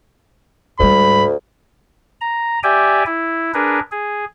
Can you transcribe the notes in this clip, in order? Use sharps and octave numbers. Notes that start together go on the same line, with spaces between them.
D2 G#2 G3 B5
A#5
G4 D5 E5 G5 G#5
E4
D4 G#4 A#4 B4
G#4